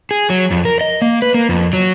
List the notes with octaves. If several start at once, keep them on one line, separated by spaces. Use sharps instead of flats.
G#4
F#3
F2
A#4
D#5
A#3
B4
A#3
F2
F#3